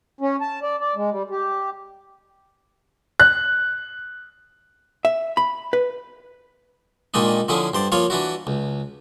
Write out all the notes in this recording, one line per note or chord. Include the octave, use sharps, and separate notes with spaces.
C#4
A5
D5
D5
G#3
G3
G4
F#6
E5
B5
B4
A#2 D#3 G#3 A#3 D4 D#4
D3 F3 C#4 E4 G#4
G2 C5 D5
F3 A#3 F4 C#5
E3 D4 E4 F#4
C#2